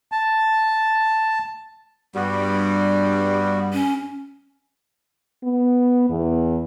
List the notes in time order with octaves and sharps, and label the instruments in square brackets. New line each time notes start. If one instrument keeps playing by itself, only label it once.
[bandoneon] A5
[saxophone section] G2 G3 [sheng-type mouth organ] B3 F#4
[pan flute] C#4
[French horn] B3
E2